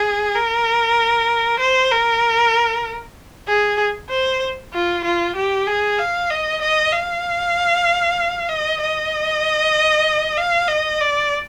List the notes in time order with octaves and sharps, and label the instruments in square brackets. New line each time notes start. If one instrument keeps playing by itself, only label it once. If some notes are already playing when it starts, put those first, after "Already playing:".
Already playing: [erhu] G#4
A#4
C5
A#4
G#4
C5
F4
F4
G4
G#4
F5
D#5
D#5
F5
D#5
D#5
F5
D#5
D5